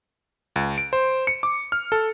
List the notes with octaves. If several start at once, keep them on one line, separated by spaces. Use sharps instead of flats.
C#2
D7
C5
C#7
D6
F6
A4